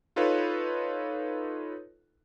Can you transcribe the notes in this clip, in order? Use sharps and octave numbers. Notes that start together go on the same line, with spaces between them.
D#4 F4 A4 B4 C#5